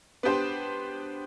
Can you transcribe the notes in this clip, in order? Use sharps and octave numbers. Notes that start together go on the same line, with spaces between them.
B3 D4 G4 C5